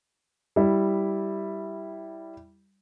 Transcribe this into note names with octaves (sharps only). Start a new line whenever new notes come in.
G3 E4